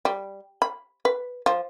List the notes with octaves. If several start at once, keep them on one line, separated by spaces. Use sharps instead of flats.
G3
B5
B4
F3